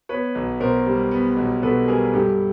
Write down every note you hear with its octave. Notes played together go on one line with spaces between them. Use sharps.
B3 B4 C#5
B1
B2 A#4 C5
G3
B3
B1
B2 A4 B4
G3 G#4 A#4
G2 G4 A4